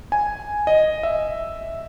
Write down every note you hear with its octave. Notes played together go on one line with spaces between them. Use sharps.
G#5
D#5
E5